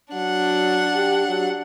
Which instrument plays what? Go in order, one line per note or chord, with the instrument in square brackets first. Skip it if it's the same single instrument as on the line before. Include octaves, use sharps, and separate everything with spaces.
[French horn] F#3 [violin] D4 F#5
[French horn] G4
F#3